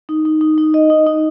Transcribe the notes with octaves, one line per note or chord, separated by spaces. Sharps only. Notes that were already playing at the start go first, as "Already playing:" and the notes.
D#4
D#4
D#4
D#4
D#5
D#4
D#4